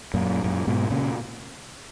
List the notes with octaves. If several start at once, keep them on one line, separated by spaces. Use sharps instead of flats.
F#2 A#2
F#2 A#2
G#2 B2
A#2 C#3